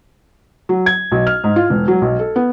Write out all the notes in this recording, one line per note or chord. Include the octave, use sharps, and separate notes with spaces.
F#3
G#6
B1
F6
G#2
F4
E1
F#3
B1
A4
B3